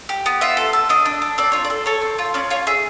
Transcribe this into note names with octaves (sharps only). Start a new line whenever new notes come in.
G4
B3
F4 E5
A4
A4
D4 D#5
D4
D4
C4 D5
F4 C#5
D5
A4
A4 C#5
C4
F4
C#4 D5
F4 C#5
G#4 E5